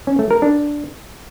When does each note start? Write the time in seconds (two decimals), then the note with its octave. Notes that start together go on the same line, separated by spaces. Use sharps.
0.07 C#4
0.19 A3
0.31 A#4
0.42 D4